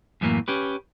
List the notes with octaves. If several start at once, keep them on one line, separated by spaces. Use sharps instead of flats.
F#2 A2 E3 A3 A#3
C#4 G4 B4